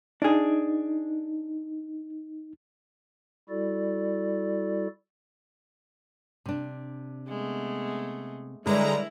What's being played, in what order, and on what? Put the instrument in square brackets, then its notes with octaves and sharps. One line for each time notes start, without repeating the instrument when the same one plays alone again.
[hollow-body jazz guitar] D4 G#4 [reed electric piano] D#4
[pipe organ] G3 E4 F#4 A4 D5
[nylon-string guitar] C3 D4
[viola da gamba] G#3 A3 B3
[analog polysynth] D3 G#3 A#5 [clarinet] G3 [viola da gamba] E4 [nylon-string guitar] A#4 B4 C#5